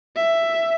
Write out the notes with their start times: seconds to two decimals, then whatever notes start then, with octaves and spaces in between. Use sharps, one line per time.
0.16 E5